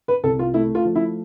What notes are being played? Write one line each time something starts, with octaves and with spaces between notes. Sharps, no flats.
B4
C2 A4
F4
A3 E4
F4
F3
E4